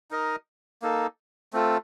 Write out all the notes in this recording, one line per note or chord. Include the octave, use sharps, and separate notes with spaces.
D#4 A#4 D#5
A#3 D#4 A4
A3 C4 F4 A4